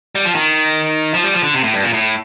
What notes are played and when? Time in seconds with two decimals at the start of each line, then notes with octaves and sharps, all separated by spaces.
0.15 G3
0.25 F3
0.35 D#3
1.14 F3
1.24 G3
1.34 F3
1.43 D3
1.54 C3
1.64 A2
1.74 G2
1.83 A#2
1.93 A2